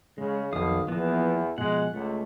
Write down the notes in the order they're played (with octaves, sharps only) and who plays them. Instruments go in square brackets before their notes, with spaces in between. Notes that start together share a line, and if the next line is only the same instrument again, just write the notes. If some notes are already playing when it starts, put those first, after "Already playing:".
[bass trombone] C#3 [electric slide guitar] G#3
[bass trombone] B1 [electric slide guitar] F2 [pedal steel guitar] D#3 F5 D#6
[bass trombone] E2 [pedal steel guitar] E3 B3 [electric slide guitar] F3 A#3
[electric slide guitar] B2 F3 [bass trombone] G#3 [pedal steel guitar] F#5
[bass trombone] C#2 [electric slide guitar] A3